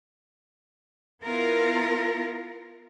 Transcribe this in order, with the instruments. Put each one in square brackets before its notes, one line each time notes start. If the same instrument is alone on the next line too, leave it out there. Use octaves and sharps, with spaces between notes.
[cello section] B3 E4 F4 A#4